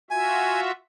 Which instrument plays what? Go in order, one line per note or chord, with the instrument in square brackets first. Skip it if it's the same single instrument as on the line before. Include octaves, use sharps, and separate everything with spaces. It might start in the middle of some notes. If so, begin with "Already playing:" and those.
[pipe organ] F4 F#4 E5 [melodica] G#5